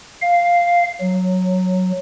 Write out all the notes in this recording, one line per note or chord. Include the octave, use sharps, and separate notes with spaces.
F5
F#3